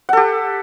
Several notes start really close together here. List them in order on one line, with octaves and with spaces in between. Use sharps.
F#5 A4 G4